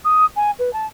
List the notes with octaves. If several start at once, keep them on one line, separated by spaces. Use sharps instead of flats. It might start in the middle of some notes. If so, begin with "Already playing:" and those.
D#6
G#5
B4
A5